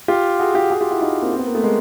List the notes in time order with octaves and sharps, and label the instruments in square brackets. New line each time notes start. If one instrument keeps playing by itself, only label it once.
[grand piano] F4 G4
F#4 G#4
F4 G4
F#4 G#4
F4 G4
E4 F#4
D#4 F4
A#3 C4
C4
B3
A#3
A3 B3
G#3 A#3